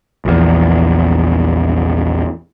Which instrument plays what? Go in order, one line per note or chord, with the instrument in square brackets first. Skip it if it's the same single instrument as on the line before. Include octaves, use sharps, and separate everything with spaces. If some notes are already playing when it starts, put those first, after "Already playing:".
[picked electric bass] A#1 E2